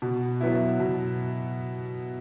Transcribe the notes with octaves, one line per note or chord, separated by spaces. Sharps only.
B2
F#3 B3 E4
B2